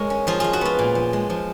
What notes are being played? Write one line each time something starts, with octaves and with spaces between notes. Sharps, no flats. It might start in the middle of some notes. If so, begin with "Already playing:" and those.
Already playing: G#3 A#4 C#5
C#4
F3 F4 G#4
G#3 F4 G#4
F#4
B3 F4
A#2
F3
G#3
F3